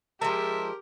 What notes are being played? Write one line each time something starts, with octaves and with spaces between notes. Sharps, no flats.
F3 G#3 G4 A#4 E5